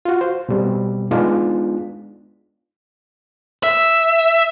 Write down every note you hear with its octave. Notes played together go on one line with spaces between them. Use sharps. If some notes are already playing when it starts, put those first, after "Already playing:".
F4 F#4
C5
B2 G3 C4
G#3 B3 D4 D#4 F4
E5